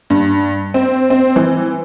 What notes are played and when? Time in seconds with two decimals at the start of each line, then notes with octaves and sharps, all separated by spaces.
0.10 G2
0.74 C4
1.10 C4
1.36 E3